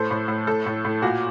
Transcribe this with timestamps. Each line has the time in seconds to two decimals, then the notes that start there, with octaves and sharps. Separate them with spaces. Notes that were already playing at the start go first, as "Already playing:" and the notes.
Already playing: A2 A4 C5
0.11 A2
0.28 A2
0.47 A2 A4
0.66 A2
0.85 A2
1.02 A#2 F#4